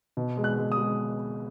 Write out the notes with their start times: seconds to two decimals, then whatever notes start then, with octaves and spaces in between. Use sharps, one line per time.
0.17 B2
0.37 G#3
0.44 F#6
0.58 G#3
0.72 D#6
0.78 G#3